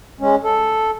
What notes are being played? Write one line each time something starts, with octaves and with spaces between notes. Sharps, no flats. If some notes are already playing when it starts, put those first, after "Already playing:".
G#3 C#4
A4